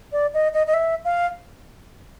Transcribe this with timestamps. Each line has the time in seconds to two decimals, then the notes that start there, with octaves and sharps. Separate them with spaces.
0.12 D5
0.34 D#5
0.54 D#5
0.67 D#5
0.74 E5
1.05 F5